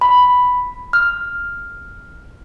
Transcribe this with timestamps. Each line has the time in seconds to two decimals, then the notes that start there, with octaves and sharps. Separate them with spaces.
0.01 B5
0.93 F6